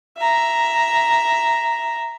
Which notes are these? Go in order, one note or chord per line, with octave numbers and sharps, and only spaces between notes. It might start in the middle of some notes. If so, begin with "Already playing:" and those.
E5 A#5